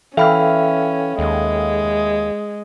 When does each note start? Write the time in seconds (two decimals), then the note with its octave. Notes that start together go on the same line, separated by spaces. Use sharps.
0.17 E3 C#4 A4 E5 F5 G5 B5 F6
1.19 D#2 G#3